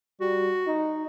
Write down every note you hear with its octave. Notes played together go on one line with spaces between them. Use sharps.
G3 F#4
D#4